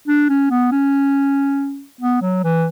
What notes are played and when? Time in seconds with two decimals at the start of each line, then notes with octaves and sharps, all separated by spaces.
0.08 D4
0.29 C#4
0.50 B3
0.72 C#4
2.01 B3
2.22 F#3
2.44 E3